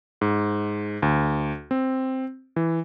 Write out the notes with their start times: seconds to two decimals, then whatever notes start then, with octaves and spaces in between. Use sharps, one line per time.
0.21 G#2
1.02 D2
1.71 C4
2.56 E3